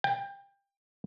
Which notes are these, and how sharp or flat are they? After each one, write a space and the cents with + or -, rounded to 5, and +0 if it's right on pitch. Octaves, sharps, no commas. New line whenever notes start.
G5 +25